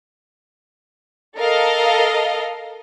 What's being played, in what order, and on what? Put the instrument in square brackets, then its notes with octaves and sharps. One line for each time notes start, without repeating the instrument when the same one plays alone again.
[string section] A4 A#4 D#5 F5